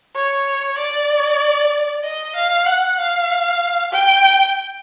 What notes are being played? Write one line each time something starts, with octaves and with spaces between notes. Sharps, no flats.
C#5
D5
D#5
F5
F#5
F5
G5